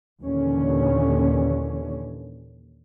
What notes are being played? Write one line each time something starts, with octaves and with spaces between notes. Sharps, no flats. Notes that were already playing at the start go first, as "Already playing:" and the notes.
D#2 A#2 D3 E3 C#4